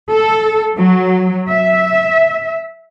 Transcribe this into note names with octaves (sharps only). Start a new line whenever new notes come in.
A4
F#3
E5